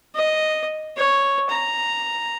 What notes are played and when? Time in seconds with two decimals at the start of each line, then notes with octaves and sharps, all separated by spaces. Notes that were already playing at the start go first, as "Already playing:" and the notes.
0.15 D#5
0.96 C#5
1.50 A#5